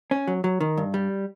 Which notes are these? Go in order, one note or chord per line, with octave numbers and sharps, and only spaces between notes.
C#4
F#3
F#3
D#3
G2
G3